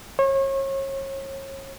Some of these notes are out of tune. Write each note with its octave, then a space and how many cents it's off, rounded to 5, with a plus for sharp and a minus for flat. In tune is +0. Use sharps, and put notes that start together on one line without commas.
C#5 -35